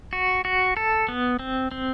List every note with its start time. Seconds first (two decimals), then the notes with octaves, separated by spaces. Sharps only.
0.13 F#4
0.45 F#4
0.77 A4
1.08 B3
1.39 C4
1.71 C4